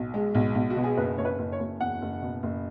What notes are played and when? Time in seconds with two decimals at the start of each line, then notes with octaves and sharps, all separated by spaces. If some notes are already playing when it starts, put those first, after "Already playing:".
Already playing: B1
0.14 G#3
0.35 B1
0.55 B1
0.70 F#4
0.76 B2
0.84 G#4
0.97 F#1 B4
1.18 F#1 C#5
1.25 B4
1.38 F#1
1.52 C#5
1.59 F#1
1.80 E2 F#5
2.02 F#1
2.22 B2
2.43 F#1